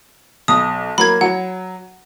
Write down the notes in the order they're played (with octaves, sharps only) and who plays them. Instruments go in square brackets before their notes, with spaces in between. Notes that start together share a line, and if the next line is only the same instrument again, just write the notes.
[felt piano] B1 [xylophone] D#6
[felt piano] F#3 A#3 [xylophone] B5 G#6
[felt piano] F#3 [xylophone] F#5